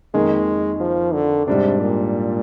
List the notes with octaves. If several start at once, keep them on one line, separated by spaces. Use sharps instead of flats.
F2 D#3 G#3 A#3
F3
D3
G#2 C3 G3 D4
A#2